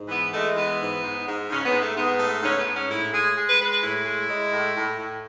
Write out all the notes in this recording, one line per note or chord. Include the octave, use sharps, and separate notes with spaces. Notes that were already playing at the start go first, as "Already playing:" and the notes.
Already playing: G#2
E3 B3
G#3 A3
E3 B3
G#2
G#2
G#2
G#2 C#4
B3
G#2
A3
G#2 B3
A3
G#2 C#4
B3
G#2
C#4
A2 E4
G#3 G#4
G#3
B4
G#3 B4
B4
A2 E4
G#3
G#3
A2
A2
A2